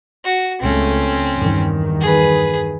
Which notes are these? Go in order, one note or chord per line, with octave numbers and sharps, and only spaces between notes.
F#4
C#2 A3 C4 C#4
E2 G2 D#3
G#4 B4